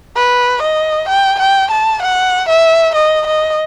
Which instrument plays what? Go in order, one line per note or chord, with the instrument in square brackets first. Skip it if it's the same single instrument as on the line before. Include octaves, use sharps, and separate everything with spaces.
[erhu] B4
D#5
G5
G5
A5
F#5
E5
D#5
D#5